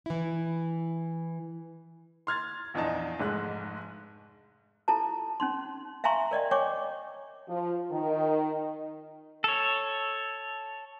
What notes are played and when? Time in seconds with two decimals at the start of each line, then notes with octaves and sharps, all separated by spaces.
0.06 E3 E4
2.27 C6 F6 G#6 A6
2.74 A#1 E2 D4 D#4 A5
3.20 F1 G#2 G#3 F#6
4.88 E4 F4 A4 A5 A#5
5.40 C#4 D#4 C6
6.04 E5 F5 G#5 A#5 C6 C#6
6.31 A#4 D5 D#5 G5
6.51 C#5 G5 G#5 C#6 D6
7.49 F3
7.92 D#3
9.44 A4 C#5